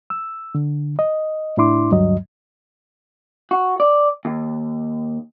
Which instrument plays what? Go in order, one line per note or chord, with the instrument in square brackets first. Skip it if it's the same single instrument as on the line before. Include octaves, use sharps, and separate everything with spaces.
[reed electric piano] E6
D3
D#5
A2 D4 E4 C6 D6
D2 G2 F#3 D#5
[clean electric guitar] F#4
D5
D#2